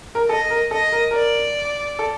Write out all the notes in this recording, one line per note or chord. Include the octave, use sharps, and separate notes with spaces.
A#4
A4 D#5
A#4
A4 D#5
A#4
A#4 D5
A4